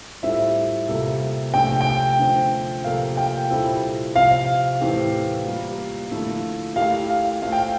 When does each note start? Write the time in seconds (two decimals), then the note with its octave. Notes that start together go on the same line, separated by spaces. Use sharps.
0.23 A2 G3 C4 F4 A4 E5
0.88 C3 G3 A#3 F4 A4
1.54 C3 F3 A3 D4 F4 G5
1.81 G5
2.19 D3 F3 A3 C4
2.84 C3 F3 A#3 F4 A4 F5
3.17 G5
3.49 A#2 G3 C4 E4 A4
4.16 C3 F3 C4 F5
4.81 A2 E3 A3 C4 G4
5.46 G3 A#3 F4 A#4
6.11 D3 F3 A3 E4
6.76 A3 E4 G4 A#4 F5
7.10 F5
7.42 A3 C4 F4 F5
7.52 G5